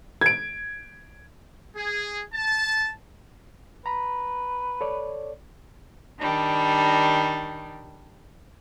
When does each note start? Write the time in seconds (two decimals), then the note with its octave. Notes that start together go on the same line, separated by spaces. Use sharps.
0.21 G#6 D7
1.75 G#4
2.33 A5
3.86 B4 A#5 B5
4.81 A4 C#5 D5
6.18 D#3 G3 D4